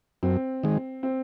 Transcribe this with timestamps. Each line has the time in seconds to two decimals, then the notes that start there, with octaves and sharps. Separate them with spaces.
0.23 F#2 C4
0.63 D#3 G#3
1.03 C4